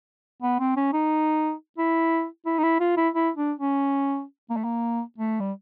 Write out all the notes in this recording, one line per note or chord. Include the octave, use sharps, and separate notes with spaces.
B3
C4
C#4
D#4
E4
E4
D#4
E4
F4
E4
E4
D4
C#4
A#3
A3
A#3
A3
G3